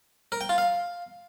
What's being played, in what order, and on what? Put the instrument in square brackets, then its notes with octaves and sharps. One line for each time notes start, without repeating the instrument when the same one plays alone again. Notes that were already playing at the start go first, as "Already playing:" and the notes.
[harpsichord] A#4
G5
F4
F5